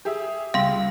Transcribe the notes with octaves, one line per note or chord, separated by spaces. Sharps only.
G4 G#4 E5
C#2 G3 F5 C6